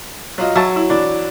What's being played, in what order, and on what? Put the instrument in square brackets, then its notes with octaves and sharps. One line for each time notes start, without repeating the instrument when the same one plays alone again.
[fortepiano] F#3 F4 D#5
[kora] F#3 [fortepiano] E5 A5 C#6
[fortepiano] E4
E3 D4